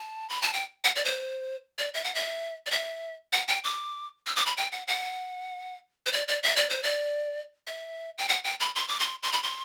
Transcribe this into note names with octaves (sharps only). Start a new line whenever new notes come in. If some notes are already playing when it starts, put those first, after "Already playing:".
Already playing: A5
B5
A5
G5
F#5
D5
C5
D5
E5
F#5
E5
D5
E5
F#5
G5
D6
E6
D6
B5
G5
F#5
F#5
C5
D5
D5
E5
D5
C5
D5
E5
G5
F#5
G5
B5
C6
D6
C6
C6
B5
C6